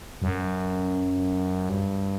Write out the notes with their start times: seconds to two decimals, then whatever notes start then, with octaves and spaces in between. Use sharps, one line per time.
0.22 F#2
1.69 G2